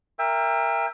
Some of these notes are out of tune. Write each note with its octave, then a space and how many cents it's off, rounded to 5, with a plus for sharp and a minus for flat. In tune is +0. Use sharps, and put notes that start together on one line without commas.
A#4 +0 E5 +15 G5 +35